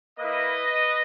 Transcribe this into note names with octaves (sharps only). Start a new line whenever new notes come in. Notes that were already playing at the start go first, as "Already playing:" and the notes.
A#3 E4 B4 D#5